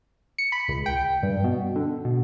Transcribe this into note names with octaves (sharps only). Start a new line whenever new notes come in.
C#7
B5
C#2
G5
G2
B2
D3
B2